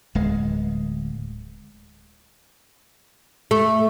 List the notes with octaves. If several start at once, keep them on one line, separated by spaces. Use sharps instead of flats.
D1 G#3
A3